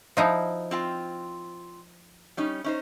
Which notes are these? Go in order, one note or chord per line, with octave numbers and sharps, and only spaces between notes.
F3 D#4 E4
C4 F4 G5
G3 C#4 D#4
C#4 D#4 C5